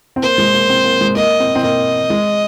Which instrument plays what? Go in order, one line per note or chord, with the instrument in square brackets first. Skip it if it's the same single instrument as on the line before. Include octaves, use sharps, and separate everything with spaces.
[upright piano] C4
[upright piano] A#3 [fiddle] C5
[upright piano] G#3
A#3
C4
A#3
G#3
[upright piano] A#3 [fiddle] D#5
[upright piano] C4
C4
[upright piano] A#3 [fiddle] D#5
[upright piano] G#3